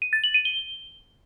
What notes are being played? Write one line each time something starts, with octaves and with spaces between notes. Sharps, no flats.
D#7
A6
F#7
D#7
G7